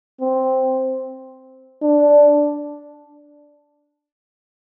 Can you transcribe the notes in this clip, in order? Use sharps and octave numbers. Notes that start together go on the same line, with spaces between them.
C4
D4